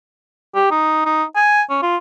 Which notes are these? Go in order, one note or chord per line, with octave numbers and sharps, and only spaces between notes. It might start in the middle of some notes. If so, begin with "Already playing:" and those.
G4
D#4
D#4
G#5
C#4
F4